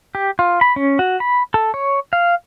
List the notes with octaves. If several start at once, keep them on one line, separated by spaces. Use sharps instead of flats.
G4
F4
B5
C#4
F#4
B5
A4
C#5
F5